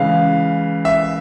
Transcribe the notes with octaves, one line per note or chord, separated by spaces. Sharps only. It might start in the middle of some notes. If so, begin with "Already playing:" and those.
Already playing: C#3 E3 G#3 F5
E5